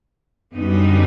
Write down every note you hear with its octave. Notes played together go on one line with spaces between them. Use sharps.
F#2 D3 G3 B3 D#4